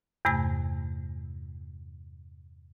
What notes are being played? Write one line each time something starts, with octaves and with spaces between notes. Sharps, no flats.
E2 G2 C3 A3 G#5 G#6